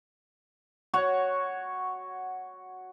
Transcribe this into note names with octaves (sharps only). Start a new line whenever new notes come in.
F#4 C#5 F#5